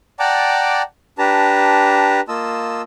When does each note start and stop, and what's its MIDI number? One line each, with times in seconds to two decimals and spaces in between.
0.19 0.82 74
0.19 0.82 78
0.19 0.82 79
0.19 0.82 81
0.19 0.82 82
0.19 0.82 86
1.19 2.21 62
1.19 2.21 67
1.19 2.21 71
1.19 2.21 81
1.19 2.21 82
2.29 2.82 58
2.29 2.82 65
2.29 2.82 75
2.29 2.82 81
2.29 2.82 88